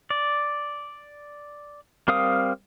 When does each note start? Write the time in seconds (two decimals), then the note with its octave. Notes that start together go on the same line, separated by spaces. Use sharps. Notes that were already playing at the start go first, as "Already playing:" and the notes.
0.10 D5
2.08 G3 C4 A#4 F5 D#6